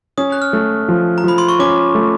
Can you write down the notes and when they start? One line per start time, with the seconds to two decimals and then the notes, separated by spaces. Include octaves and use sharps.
0.18 C#4 D#6
0.32 F#6
0.42 F6
0.53 A3
0.88 F3
1.18 A#5
1.24 F3 B5
1.38 C6
1.48 C#6
1.59 C#4 D6
1.95 A3